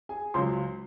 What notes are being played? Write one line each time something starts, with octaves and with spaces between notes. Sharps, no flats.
G#4 G#5
C#2 C#3 F#3 C5 C6